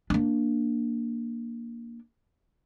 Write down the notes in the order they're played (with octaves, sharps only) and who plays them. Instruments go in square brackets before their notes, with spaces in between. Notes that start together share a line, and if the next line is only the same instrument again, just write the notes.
[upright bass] A#3 D4